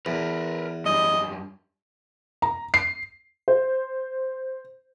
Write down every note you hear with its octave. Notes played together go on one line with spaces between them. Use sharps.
E2 A#4 B4
F#2 G3 D#5
A#5
C7
C5